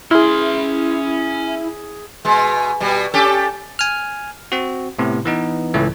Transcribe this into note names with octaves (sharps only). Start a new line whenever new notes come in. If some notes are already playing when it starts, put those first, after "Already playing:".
C#4 E4 G#4 C6 F6
B2 G#3
B2 G3
C#4 G4 A4
G#5 F6
C4 F#4
A2 C3 B3
E3 B3 D#4
C#2 A2 E3 A3